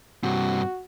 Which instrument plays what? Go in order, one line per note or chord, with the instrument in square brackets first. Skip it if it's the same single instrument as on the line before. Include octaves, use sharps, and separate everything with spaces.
[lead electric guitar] G2 C3 [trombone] F#4